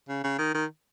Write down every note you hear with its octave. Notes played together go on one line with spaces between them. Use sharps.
C#3
C#3
D#3
D#3